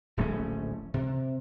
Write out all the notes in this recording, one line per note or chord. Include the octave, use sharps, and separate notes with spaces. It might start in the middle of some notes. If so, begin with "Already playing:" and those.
D1 A#1 A3 C#4
C3